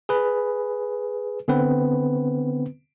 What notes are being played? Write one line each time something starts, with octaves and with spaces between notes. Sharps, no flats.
G#4 B4
D3 B3 C4 B4